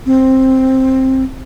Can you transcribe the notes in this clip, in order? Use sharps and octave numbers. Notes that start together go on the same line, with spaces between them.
C4